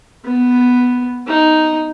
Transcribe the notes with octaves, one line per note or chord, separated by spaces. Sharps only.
B3
D#4